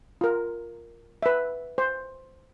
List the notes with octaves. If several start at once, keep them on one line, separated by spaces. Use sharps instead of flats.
F4 A#4
B4 E5
C5